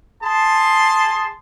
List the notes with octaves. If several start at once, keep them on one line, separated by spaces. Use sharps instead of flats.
G#4 A5 C6